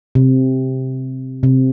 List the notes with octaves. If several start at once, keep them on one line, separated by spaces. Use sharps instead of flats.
C3
C3